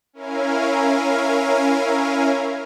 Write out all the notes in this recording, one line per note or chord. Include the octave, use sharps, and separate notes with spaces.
C#4 E4 A#4 F5 G#5